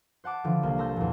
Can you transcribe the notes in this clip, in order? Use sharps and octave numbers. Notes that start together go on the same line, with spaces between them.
C5 F#5 A5 D6
D3 E3 F3
C2 A#3
A5 A#5 C6 E6 G6
E2 A#2